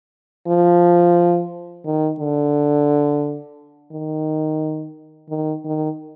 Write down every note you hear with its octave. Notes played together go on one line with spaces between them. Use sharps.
F3
D#3
D3
D#3
D#3
D#3